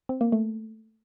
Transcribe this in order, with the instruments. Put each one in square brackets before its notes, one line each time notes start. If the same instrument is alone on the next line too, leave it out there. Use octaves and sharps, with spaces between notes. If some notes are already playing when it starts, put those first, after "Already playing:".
[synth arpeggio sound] C4
A#3
A3